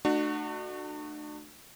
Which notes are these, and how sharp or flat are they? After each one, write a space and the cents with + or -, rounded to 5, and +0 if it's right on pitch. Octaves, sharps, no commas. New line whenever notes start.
A3 +0 D4 +40 F#4 +0